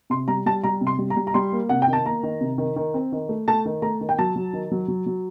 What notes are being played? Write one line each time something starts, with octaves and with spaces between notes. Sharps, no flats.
C3 C6
G3 A#5
G3 A5
G3 A#5
C3
C6
G3
A#5
G3
A#5
G3 C6
A#3
C3 F#5
G5
D#3
A5
A#3 A#5
D#3
C3
D#3
D#3
C4
D#3
A3
A3 A5
D#3
A3 A#5
D#3
G5
F#3 A5
F#3
D#3
F#3
F#3
F#3